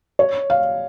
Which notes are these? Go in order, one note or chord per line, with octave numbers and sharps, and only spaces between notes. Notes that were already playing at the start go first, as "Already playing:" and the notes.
C#5
F5